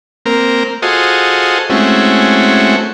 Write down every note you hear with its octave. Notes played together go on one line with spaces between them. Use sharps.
A#3 C4 A#4
F4 F#4 G#4 A4 C5 D#5
G#3 A3 C4 C#4 E4 F#4